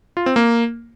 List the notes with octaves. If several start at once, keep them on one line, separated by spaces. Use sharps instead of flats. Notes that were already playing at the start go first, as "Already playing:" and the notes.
F4
C4
A#3